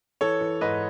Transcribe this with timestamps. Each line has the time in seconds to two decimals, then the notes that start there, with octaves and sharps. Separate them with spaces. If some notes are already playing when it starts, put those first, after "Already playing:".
0.21 E3 A4 C#5
0.41 E3
0.61 G#2 B4 D#5